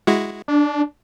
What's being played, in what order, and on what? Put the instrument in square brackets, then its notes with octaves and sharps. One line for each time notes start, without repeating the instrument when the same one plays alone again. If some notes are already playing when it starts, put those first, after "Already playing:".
[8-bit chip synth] G#3 E4 F#4
[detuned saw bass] D4